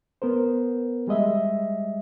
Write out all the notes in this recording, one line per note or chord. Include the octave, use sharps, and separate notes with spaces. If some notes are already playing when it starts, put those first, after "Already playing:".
B3 A#4 C5
G3 G#3 D#5 E5